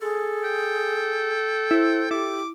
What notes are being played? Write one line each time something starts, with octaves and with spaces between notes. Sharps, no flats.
G#4 A4
G5
E4 C5
E4 G4 D6